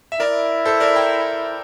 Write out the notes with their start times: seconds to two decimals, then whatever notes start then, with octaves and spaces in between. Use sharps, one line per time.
0.12 E5
0.20 E4 A#4 D5
0.65 A4 C5
0.80 A#4 D5
0.96 G5 A#5